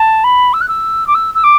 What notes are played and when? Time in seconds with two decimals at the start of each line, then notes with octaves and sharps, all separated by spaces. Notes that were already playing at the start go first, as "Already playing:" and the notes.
Already playing: A5
0.24 B5
0.53 E6
0.61 F#6
0.68 E6
1.07 D6
1.14 E6
1.34 E6
1.43 D6